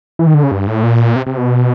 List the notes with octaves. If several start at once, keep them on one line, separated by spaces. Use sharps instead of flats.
E3
D#3
D3
C#3
G2
A2
A#2
C3
C3
B2